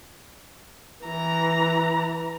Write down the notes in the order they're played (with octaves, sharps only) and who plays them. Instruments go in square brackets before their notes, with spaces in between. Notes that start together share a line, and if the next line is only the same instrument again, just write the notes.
[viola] E3 A#5